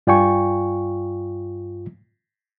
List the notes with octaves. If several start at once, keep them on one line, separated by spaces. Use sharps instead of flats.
G2 F4 D5 G5 G#5 C#6